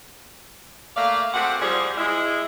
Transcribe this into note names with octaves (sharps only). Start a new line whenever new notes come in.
A3 A#3 D5 E5 F5
G#3 C4 F#4 G4 A4 F#5
F3 G3 G#4
G#3 E4